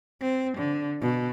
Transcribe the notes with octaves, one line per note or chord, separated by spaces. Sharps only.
C4
D3
B2